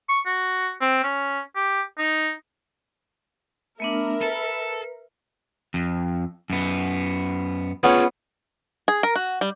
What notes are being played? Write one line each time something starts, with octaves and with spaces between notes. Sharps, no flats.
C#6
F#4
C4
C#4
G4
D#4
A3 B3 D4 A#4 E5 B5
A4 B4
F2
F#2 B3
B3 C#4 F4 G#4 B5
G#4
A#4
F#4
G3